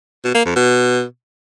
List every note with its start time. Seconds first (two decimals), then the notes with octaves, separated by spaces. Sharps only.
0.24 B2
0.35 A#3
0.45 F2
0.56 B2